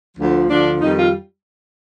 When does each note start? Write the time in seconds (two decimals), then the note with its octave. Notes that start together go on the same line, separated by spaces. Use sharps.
0.17 D2 D3 F3
0.48 D2 D3 F3 D4
0.80 F2 D#3 G3 D#4
0.97 F4